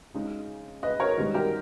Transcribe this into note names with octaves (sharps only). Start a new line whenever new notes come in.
C#3 G#3 D#4
B4 D#5
A#4 C#5
G#2 D#3 G3 B3 D#4
G4 A#4